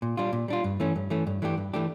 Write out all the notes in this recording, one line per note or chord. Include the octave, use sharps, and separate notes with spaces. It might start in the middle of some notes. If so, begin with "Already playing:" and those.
A#2
G3 D4 F4
A#2
G3 D4 F4
G2
E3 A3 C#4
G2
E3 A3 C#4
G2
E3 A3 D4 G4
G2
E3 A3 D4 G4